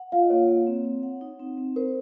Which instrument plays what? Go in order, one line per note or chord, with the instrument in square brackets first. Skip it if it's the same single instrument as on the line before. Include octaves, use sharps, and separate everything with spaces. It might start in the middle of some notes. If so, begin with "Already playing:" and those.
Already playing: [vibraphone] F#5
[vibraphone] F4 [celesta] F5
[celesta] D#5
[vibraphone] A#3 [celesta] C#5
[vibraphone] A#3
C4
C4
F#5
D#4
C4
C4
[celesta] A#4 [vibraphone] C5